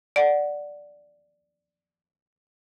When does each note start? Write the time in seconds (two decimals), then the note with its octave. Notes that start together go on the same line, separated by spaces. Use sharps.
0.16 D5 F#5